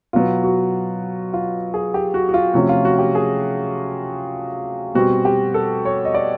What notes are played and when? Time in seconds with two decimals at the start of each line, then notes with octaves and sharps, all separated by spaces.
0.13 B2 F#3 B3 F4
0.44 F#4
1.33 F4
1.74 G#4
1.94 G4
2.14 F#4
2.29 F#4
2.34 F4
2.54 C3 F3 A3 C#4 F#4
2.69 F4
2.85 F#4
2.99 G4
3.15 G#4
4.95 B2 G3 C4 F#4
5.25 G4
5.54 A4
5.85 C#5
6.05 D#5
6.14 D5